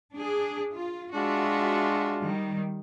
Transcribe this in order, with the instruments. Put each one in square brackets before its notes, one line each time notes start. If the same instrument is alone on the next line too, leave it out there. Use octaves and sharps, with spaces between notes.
[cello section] D4 G#4
F4
[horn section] G#3 D4 F4 [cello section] F#4 E5
[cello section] D#3 G3